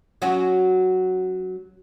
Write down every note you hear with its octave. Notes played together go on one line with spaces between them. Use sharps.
F#3 C#4 F#4